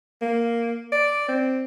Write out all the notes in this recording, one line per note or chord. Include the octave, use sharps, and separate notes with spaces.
A#3
D5
C4